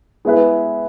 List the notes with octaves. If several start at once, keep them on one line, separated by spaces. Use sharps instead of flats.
G#3 B3 E4 B4